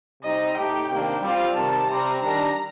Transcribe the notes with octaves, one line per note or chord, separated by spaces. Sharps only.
C3 G3 C4 D#4 D#5
A2 A3 D#4 G4 G5
C3 D#3 A#3 D4
G3 C4 F4
C3 D#3 G3 A5
C3 G3 C4 A#5
D#3 G3 D4 A#5